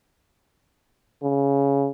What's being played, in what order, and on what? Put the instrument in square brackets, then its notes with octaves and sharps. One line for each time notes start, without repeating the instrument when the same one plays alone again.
[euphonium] C#3